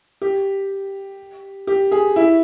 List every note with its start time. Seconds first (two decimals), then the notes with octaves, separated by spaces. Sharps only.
0.22 G4
1.67 G4
1.91 G#4
2.16 E4